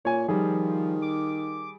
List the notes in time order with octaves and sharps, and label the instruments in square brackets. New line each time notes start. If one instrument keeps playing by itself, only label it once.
[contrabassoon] A#2 [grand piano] C#5 G#5
[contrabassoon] D#3 [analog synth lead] F3 [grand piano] G3 G#4
[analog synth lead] D6